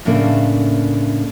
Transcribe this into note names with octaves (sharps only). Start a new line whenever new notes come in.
A2 C#3 A3 A#3 D4